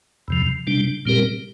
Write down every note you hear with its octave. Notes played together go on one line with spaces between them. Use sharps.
E2 C3 F3
C3 G3 D4
A#2 G3 C4 G4 A#4